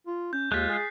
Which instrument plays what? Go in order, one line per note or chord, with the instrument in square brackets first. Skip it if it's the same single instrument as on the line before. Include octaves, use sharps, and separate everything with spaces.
[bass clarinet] F4
[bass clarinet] C#4 [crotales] G6
[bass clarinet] D#2 [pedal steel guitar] G#3 F4 [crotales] F#6 B6
[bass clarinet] G#4 [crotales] A6 C7